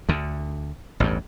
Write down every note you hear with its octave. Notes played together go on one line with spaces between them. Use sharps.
D2 D3
A1 E2 G2